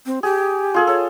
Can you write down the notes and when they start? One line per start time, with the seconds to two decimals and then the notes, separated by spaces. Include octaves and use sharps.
0.06 C4
0.23 G4 G#4
0.74 F4 G#4 A4
0.87 A4 C#5